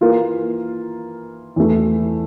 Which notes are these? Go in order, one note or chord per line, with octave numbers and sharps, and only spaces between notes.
E3 A#3 F4 A#4
E2 E3 A3